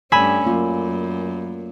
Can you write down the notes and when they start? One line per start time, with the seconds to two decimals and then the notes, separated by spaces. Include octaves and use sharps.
0.12 G2 A3 C#4 D5 G#5 B5 E6
0.46 F#2 A#3 F4